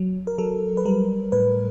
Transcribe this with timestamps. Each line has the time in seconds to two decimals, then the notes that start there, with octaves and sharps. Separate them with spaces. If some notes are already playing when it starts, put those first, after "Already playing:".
Already playing: F#3
0.27 A#4
0.38 F#3 A4
0.77 B4
0.85 G3 A#4
1.32 A2 B4